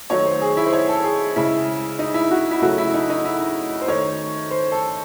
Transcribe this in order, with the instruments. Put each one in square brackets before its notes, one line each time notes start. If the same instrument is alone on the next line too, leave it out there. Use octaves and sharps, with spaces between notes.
[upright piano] D#3 F#3 A3 C#5
C5
G#4
E4
C5
C#5
A4
G#4
C#3 G#3 E4
D#4
E4
F#4
E4
C#3 F#3 A3 F#4
E4
D#4
D#4
E4
C5
D#3 A3 C#5
C5
A4